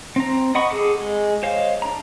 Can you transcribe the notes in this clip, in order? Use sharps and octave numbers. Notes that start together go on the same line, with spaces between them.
C4 A#5
D#5 F#5 B5 C#6
G#4 A4 D6
G#3
C5 C#5 D#5 F5
D4 A#5